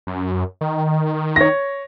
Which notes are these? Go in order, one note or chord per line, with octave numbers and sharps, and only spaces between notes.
F#2
D#3
C#5 A#6